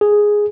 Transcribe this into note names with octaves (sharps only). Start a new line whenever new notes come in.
G#4